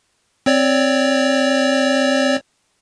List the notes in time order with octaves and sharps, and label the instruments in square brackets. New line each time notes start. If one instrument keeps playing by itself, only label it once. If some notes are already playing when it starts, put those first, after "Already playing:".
[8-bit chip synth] C4 C#5 D5